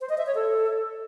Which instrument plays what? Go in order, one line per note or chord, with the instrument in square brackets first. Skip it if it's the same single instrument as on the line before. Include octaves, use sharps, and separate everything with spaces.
[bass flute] C5
D#5
E5
C#5
A4